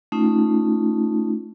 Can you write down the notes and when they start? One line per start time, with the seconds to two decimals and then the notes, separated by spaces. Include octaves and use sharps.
0.12 A3 C#4 D#4 F4